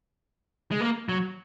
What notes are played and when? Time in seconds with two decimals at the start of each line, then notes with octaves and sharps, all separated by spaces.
0.71 G#3
0.81 A#3
1.09 F#3